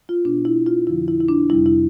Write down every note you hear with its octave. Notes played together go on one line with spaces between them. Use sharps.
F4
B2 B3 D4
E4
F4
F2 D3 F3 E4
E4
E4
D4
F2 C3 G3 E4
E4